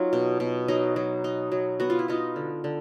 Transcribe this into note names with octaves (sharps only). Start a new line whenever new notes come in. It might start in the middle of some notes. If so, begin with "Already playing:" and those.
Already playing: F#3 D#4 F4
B2
B2
F#3 D#4
F#3
D#4
F#3
B3 F#4
F4
E4
B3 D#4 F4
D3
D3